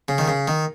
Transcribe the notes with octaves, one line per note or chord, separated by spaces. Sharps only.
C#3
D#3
C#3
D#3